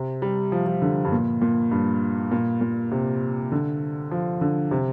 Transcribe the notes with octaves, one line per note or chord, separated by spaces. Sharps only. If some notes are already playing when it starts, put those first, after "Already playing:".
Already playing: C3
G3
F3
F3
D3
G2
A#2
A#2
G2
A#2
A#2
C3
D3
F3
D3
C3